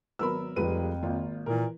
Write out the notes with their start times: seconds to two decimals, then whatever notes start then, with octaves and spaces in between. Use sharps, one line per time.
0.19 G#1 F#3 B3 A#4 B5 E6
0.56 F1 F2 F3 G3 G#3 B4 D#7
1.03 G#1 A#3 F4
1.46 A#2 E3 A#4